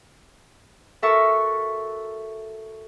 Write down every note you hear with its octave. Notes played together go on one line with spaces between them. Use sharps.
F#4 A4 A#4 E5 C#6